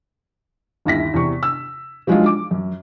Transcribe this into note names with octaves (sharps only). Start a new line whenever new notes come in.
G1 D#2 E4 A#6 B6
E2 C3 C#6
E6
F3 F#3 G#3 D4 D#4 F4
D6
F#2